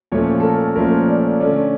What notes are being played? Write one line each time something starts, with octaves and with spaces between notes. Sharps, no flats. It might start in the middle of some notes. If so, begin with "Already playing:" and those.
A#2 F3 A3 C#4 C#5
A4
A#4
A#2 F3 A3 C#4 A#4
D5
D3 A3 C#4 D5